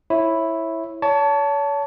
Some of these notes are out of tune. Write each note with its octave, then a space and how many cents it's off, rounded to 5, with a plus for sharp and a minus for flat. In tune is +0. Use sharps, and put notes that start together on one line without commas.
E4 +0 C#5 -25
C#5 +35 A5 +0